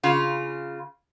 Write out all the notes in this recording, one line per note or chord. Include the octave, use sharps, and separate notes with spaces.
C#3 F4